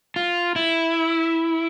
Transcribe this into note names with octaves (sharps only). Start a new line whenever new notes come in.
F4
E4